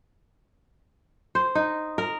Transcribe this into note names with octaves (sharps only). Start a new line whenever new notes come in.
C5
D#4
A#4